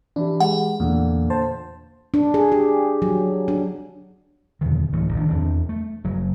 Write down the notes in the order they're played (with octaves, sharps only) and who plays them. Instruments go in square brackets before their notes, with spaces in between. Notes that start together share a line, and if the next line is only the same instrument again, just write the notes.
[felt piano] E3 G4 [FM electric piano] D4
[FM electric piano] G#3 [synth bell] F#5
[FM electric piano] E2 [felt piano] A#2 D3
[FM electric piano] C5 A5
[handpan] D4
G#4
G4
F#3
D4
[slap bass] E2 B2 D3 D#3
D1 D2 E3 A3
G1 D#3 C4 D4
E2 C4 D4
A3
F#1 F#3